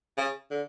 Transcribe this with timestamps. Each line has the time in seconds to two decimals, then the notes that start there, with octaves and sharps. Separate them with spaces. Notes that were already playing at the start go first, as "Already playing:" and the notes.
0.17 C#3
0.51 D3